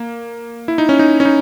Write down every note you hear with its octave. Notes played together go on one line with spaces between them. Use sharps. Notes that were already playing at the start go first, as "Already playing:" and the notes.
Already playing: A#3
E4
D#4
C#4
D#4
C#4
D#4